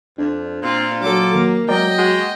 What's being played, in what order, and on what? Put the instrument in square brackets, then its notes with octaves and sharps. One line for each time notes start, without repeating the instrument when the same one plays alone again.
[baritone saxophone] F2 [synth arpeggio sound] D4
[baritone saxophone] A#2 [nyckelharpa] C4 F4
[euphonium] F#3 [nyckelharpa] A4 D6
[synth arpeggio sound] D#3 [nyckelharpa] A#3
[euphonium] F#3 [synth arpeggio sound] G#3 A#4 D5 [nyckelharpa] D#5 G5
[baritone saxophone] G#3 [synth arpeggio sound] F#4